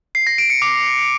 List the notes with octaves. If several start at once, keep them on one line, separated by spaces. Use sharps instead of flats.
C7
A#6
D7
C#7
D6